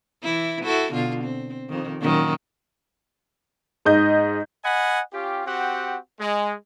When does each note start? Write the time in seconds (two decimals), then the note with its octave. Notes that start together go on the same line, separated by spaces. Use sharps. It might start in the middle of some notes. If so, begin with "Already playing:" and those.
0.23 E3 E4
0.64 E4 F#4 A4
0.92 B2 D3 F4
1.24 C4
1.69 F2 D#3
2.01 F#2 A#2 D#3
3.85 G#2 D#5 G6
4.64 D#5 F#5 G#5 B5
5.13 C#4 F4 G4
5.47 C4 F#4 G4 F#5
6.20 G#3